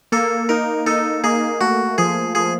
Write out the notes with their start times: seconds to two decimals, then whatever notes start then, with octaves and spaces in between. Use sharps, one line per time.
0.12 A#3 A4
0.49 D#4 A#4
0.86 D#4 A4
1.24 A#3 G#4
1.61 A3 F#4
1.98 F3 G#4
2.35 F3 G#4